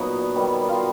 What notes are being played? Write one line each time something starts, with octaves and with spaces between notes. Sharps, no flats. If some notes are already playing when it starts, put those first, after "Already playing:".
Already playing: A#2 F#3 B3 D#4
D#3 G3 B3
F4
F#4